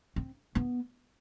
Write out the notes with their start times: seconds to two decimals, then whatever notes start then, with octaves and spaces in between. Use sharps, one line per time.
0.16 C4
0.55 B3